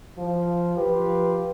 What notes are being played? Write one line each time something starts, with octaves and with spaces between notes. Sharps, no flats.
F3
F3 F4 G4 B4